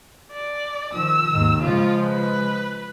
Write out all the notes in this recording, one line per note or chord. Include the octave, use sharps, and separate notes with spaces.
D5
D#3 F3 E6
D#2 G#2 D#3
C#3 F3 G#3 F4
B4